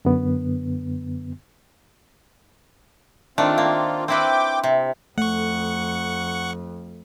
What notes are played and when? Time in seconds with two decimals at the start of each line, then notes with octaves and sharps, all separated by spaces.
0.05 F#2 D3 B3
3.38 D#3 A3 C4 D4 F4
3.58 A#3
4.08 C4 E4 B4 G5 D6
4.63 C3
5.18 F2 A3 F#5 C#6